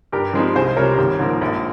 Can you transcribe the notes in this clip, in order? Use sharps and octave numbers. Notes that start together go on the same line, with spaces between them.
G2 G4 A#4
F3 G#3 C4 D#4
C2 G#4 C5
C3 G3 A#4 C#5
G#1
G#2 F3 A#3
A#1